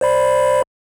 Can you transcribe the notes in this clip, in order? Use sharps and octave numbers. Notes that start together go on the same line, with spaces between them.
C5 D5 B5